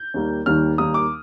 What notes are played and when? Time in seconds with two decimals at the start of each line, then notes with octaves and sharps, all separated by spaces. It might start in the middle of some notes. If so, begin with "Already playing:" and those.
Already playing: G6
0.14 D#2 D#3 G3 A#3
0.46 D#2 D#3 G3 A#3 F6
0.78 D#2 D#3 G3 A#3 D#6
0.94 D6